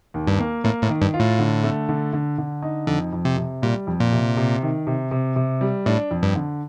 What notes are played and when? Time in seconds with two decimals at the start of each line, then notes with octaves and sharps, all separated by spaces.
0.14 D#2
0.27 G2
0.39 A#3
0.64 A2 A#3
0.83 A2
0.89 D#3
1.02 G2
1.14 F4
1.20 A2
1.39 D3
1.64 A3
1.89 D3
2.13 D3
2.38 D3
2.62 D#4
2.87 F2 D3
3.13 F2
3.25 C3
3.37 C3
3.62 A#2 G3
3.87 F2
4.00 A#2
4.12 C3
4.37 C3
4.62 D#3
4.87 C3
5.11 C3
5.36 C3
5.61 G3
5.86 A2 D4
6.11 F2
6.23 G2
6.36 D3